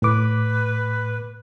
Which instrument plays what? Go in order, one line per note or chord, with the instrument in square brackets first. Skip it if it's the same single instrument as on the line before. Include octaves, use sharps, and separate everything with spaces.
[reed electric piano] A2 D6 [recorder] B4